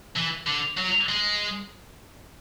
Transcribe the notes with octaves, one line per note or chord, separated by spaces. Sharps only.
E3
D3
F#3
G#3